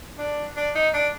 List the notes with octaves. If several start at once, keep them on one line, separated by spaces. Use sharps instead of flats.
D4
D4
D#4
D4